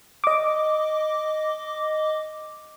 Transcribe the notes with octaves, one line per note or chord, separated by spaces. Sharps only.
D#5 D6